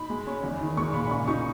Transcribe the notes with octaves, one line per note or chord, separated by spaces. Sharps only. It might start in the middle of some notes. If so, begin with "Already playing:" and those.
Already playing: D#4 B5
G#3
C#4
E2
D#3
G#3 C#6
A#2 B5
B5
C#3 C#6
D#4 C#6